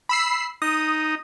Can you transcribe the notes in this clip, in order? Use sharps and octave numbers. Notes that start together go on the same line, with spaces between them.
B5 E6 C7
D#4 D#6